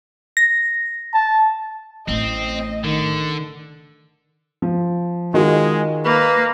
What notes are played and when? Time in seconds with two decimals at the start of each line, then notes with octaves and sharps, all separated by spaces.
0.37 A#6
1.14 A5
2.08 A1 A2 C4 D#5
2.85 D3 D#3
4.62 F3
5.34 D#3 G#3 F4 F#4
6.05 A#3 B4